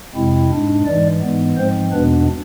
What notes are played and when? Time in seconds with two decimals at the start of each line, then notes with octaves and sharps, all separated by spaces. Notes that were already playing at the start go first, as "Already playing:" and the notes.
0.15 F2 C3 G#3 C4 E4
0.50 G#2 G#3 D4
0.86 G#2 E3 G#3 D5
1.22 G#2 E3 G#3 B3
1.57 G#2 F3 G#3 C4 C5
1.92 E2 B2 G#3 B3 D4 B4